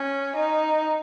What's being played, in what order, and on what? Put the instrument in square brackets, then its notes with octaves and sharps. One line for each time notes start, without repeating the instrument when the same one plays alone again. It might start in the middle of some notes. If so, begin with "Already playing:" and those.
Already playing: [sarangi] C#4
D#4